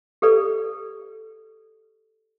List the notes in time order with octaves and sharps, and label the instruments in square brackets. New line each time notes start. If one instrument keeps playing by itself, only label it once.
[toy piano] G4 A4 B4 D5